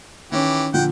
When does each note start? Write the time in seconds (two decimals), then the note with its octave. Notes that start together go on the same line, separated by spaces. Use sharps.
0.32 D#3 E3 C#4 G4
0.74 A#2 D3 F3 F#5 G5